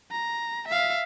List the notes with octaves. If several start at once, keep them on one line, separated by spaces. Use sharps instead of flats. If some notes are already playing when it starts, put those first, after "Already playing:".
A#5
E5 F5